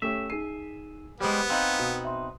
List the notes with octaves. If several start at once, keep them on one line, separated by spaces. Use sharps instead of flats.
A3 C#4 G4 E5
D#4 G#4 C7 D#7
G3 G#3 B3 G4 C5 D#6
C4 D#4 B4 F5
B2 D#6
E5 C6